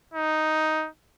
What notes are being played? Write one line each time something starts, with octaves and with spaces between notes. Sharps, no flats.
D#4